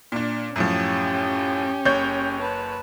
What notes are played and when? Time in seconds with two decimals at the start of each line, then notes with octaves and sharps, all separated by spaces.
0.12 A#2 D4
0.56 F#2 A2 F3 C#4 G4
1.86 F#1 C#5 G6
2.41 B4 A5